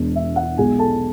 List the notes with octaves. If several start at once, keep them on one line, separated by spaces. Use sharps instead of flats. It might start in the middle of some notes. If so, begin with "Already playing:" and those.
Already playing: E1 E2 B2 G#3 D4
E5
F#5
B1 B2 G#3 G#4 G#5
A4 A5